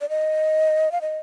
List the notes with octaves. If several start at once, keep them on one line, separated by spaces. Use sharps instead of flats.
D5
D#5
F5
D#5